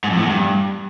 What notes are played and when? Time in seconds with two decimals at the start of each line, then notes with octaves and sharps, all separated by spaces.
0.04 G#2
0.10 F2
0.17 A2
0.23 E2
0.30 G2